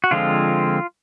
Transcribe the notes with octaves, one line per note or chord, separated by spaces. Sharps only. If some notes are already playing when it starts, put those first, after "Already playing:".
F#4
D3 F3 G#3 C4 F4